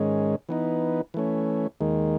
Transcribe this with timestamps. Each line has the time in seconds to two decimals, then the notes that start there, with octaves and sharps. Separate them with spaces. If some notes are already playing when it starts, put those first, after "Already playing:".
Already playing: G#2 D#3 G#3 C#4
0.49 E3 B3 D#4
1.14 E3 A3 C#4
1.81 D#2 D#3 G#3